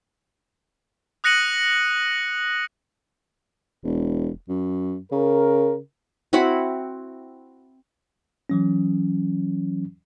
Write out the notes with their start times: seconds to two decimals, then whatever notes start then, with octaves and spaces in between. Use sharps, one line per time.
1.24 D#6 F#6 A#6 C#7 D#7 F#7
3.84 E1
4.49 F#2
5.12 C#3 A#4
6.33 C4 E4 F#4 B5
8.50 E3 F#3 C#4